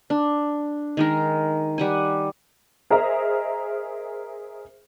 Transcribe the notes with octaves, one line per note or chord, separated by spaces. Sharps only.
D4
D#3 G#3 A#4
G3 F#5 G#5
G#4 A#4 C5 D#5 E5 A#5